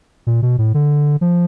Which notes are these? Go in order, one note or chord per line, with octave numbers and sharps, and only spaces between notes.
A#2
B2
A2
D3
F3